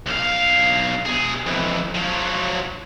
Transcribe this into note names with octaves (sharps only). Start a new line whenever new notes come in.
B1 F5
B2 G#4
F2 E3
F3 F#3